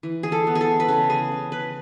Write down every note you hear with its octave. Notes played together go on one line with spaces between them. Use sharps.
E3
G#4
A4
B3
G#4
A4
B4
C#3 A4
G#4
C#3
B4